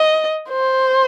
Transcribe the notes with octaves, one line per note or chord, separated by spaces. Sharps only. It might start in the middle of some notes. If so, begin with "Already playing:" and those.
Already playing: D#5
C5